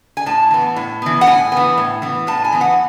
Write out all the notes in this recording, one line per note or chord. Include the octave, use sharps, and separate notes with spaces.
G#5
A2 A5
E3 B3
A2
E3 B3
F#5
A2 G#5
E3 B3
A2
E3 B3
A2 A5
G#5
E3 B3
F#5